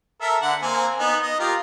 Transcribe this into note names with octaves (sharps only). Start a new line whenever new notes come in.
A4 A#4 E5
D3 F#5
A#3 C4 G#5
B3 D#4
D#5
F4 G4 A#4